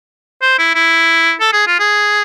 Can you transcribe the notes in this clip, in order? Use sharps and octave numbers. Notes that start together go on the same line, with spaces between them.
C5
E4
E4
A4
G#4
F4
G#4